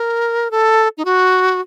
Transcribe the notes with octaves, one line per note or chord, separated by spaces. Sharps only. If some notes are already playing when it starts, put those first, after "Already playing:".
Already playing: A#4
A4
D#4
F#4